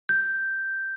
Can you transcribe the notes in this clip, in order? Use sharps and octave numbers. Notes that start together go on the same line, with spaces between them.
G6